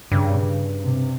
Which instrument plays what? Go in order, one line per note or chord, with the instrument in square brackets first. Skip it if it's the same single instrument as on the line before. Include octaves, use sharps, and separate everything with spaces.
[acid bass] G2 [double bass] C#3
[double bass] C3